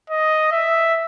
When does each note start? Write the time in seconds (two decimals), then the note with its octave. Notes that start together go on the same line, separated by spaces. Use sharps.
0.10 D#5
0.52 E5